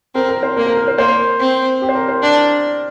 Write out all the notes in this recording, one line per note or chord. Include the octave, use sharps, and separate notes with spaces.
C4 A#4
A#4
C5
A#3 A#4
A#4
A#4
C5
A#3 C5
C4
G4
C5
A#4
C5
D4 D5